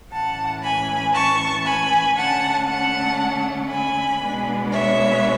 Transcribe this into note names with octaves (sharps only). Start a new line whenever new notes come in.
A2 E3 A3 C#4 F#5 A5
G#5 B5
A5 C#6
G#5 B5
D3 A3 C#4 F#5 A5
F#5 A5
G#5 B5
B2 G#3 B3 D4
C#5 E5